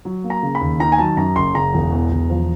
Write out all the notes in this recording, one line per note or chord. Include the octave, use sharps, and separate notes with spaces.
F#3
A#3
A#5
C#3
B5
D#2
D#3 A#5
G#5
F#3 A5
F#2 A#5
F#1 C6
C#3 A#5
E1
E2
E1
F3